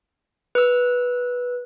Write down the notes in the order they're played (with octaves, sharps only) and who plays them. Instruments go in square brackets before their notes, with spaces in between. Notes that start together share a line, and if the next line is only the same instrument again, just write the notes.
[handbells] B4 E6